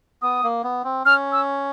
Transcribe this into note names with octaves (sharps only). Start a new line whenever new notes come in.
B3 D#6
A#3
B3
C4
C#4 F6
E6